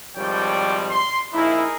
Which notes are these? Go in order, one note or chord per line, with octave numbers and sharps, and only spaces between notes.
G#1 F3 G3 C#5 D5 G5
C6
A#1 D#4 E4 G#4 A#4